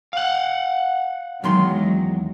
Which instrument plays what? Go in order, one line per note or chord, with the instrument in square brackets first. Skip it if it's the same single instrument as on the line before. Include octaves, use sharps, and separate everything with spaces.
[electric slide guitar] F5 F#5
[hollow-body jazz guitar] E2 D#3 C6 [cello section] F#3 G#3